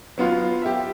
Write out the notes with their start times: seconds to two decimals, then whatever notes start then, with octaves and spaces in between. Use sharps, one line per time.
0.18 F#3 B3 F4 F6
0.62 G4 E5